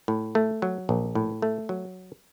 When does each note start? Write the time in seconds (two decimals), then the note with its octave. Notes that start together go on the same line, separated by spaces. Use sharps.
0.08 A2
0.35 A3
0.62 F#3
0.89 A#1
1.15 A2
1.42 A3
1.69 F#3